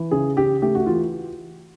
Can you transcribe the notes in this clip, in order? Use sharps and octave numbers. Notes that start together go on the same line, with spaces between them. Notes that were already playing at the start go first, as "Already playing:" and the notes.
Already playing: E3
C#3 G#4
C#3 G4
A3 G4
F#4
E3 F4